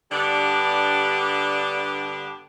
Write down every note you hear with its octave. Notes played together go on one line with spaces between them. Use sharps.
G2 D3 B3 D4 G4 D5